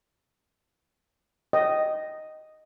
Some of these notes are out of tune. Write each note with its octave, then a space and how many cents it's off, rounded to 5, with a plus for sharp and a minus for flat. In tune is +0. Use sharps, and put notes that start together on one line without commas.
D#5 +0 G5 -20